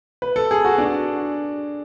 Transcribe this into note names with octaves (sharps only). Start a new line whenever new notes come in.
B4
A4
G#4
F#4
D4